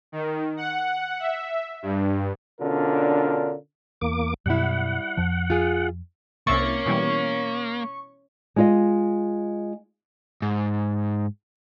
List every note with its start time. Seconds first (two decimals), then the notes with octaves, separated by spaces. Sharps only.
0.12 D#3
0.57 F#5
1.20 E5
1.82 G2
2.61 B2 D3 C#4 D4 F4 A#4
4.01 E2 A#3 D6
4.46 F#2 B2 G3 E4 F#5
5.17 F2 F3
5.50 F4 G#4
6.47 C2 A#3 C#4 E5 C#6 A6
6.86 B2 E3 G3
8.56 G#3 F4 D#5
10.42 G#2